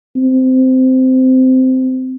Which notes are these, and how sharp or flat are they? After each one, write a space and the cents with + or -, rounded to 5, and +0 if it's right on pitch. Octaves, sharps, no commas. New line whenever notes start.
C4 -15